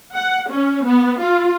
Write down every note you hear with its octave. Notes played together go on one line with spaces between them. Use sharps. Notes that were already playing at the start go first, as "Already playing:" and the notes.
F#5
C#4
B3
F4